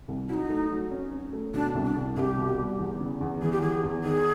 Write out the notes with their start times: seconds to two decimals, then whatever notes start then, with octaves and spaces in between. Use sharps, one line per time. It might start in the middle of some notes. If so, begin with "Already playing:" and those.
0.08 C2
0.29 F#3 E4
0.34 D#4
0.49 A3
0.71 F#3
0.91 C#4
1.12 C#4
1.33 A3
1.54 B2 D4
1.74 C2
1.86 D4
1.96 C2
2.16 C2 G4 G#4
2.37 B2
2.58 G3
2.79 E2
3.00 C#3
3.21 E2
3.42 E3 G#4
3.52 G4
3.61 E3 G#4
3.83 E2
4.04 D#3 G#4